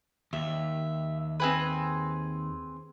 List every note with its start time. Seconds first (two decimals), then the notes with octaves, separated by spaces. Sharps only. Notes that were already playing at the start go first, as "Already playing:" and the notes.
0.33 D#2 E5
1.40 C4 G#4 B4